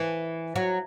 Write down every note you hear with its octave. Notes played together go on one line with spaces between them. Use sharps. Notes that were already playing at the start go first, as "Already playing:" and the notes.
Already playing: E3
F#3